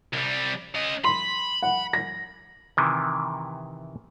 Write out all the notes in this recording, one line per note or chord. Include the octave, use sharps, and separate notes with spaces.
C2 G3
C#4 D#5
B5 C6
F#5
A#6
C3 D#3 E3